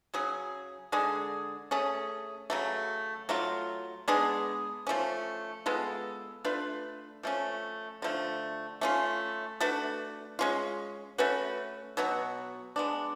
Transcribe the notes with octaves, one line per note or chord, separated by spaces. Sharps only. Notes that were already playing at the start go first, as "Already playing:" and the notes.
C#3 F#3 C#4 G#4
D3 G#3 D4 G#4
A3 C#4 G#4
C#3 F#3 A3
F#3 A3 F4
G#3 B3 D4 G#4
F3 A3 C#4
G#3 B3 F4 A4
A3 D4 F4 B4
F3 A3 C#4
D3 F3 A3
A3 C#4 F4
A3 D4 F#4 B4
G#3 C#4 F4
A3 C#4 F#4 B4
B2 F#3 B3 F#4
G#3 B3 D4